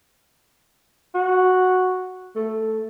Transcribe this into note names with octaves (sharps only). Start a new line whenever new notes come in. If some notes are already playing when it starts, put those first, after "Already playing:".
F#4
A3